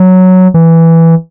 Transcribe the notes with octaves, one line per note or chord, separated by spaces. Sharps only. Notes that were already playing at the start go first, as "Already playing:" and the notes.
Already playing: F#3
E3